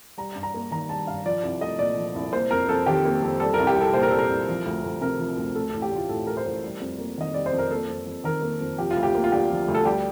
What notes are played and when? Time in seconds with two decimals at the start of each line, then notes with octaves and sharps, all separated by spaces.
0.18 G3 A#5
0.36 G2
0.43 A#5
0.54 A#3
0.71 D#3 A#5
0.89 G3 A5
1.07 G2 F5
1.25 F3 D5
1.43 C2
1.61 A3 D#5
1.79 A#2 D5
1.97 F3
2.15 C2
2.33 A#3 C5
2.51 F2 A#4
2.69 F2 A4
2.86 D#3 G4
3.05 A#3
3.22 F2
3.40 G3 A4
3.54 A#4
3.59 C2
3.67 G4
3.77 C2 A4
3.94 A#2 C5
4.03 A#4
4.11 G3 A4
4.19 A#4
4.30 C2
4.48 F3
4.66 D2
4.84 D2
5.01 C3 A#4
5.19 F3
5.37 D2
5.55 A3 A4
5.69 A1 A4
5.82 G4
5.91 A1 F4
6.09 A2 A4
6.27 A3 A#4
6.37 C5
6.45 A1 A#4
6.64 G3
6.81 F2
6.98 A#3
7.18 D#3 D#5
7.34 G3 D5
7.46 C5
7.53 F2
7.58 A#4
7.71 A#3 A4
7.89 F2
8.06 F2
8.24 D#3 A#4
8.42 A#3
8.61 F2
8.78 F3 G4
8.91 F4
8.96 D2
9.03 G4
9.15 A#3
9.24 F4
9.32 D3 G4
9.50 F3
9.68 D2
9.75 A4
9.85 G3 G4